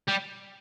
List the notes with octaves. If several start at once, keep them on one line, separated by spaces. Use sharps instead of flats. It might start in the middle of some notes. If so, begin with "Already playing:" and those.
G3